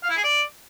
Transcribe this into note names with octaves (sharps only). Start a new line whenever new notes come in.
F5
E4
G#4
D5